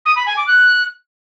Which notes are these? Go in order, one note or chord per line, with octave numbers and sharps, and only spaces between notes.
D#6
B5
G#5
D6
F#6